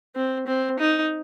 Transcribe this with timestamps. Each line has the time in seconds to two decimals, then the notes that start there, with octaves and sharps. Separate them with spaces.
0.15 C4
0.47 C4
0.79 D#4